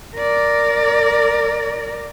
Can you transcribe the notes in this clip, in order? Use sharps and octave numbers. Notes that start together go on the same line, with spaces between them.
A#4 D5